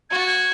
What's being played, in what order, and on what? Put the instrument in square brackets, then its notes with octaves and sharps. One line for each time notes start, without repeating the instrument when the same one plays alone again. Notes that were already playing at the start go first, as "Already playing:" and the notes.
[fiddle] F#4 [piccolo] G#6
[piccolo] A6
G#6